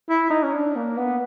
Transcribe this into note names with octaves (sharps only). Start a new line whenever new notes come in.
E4
D#4
C#4
D4
A#3
B3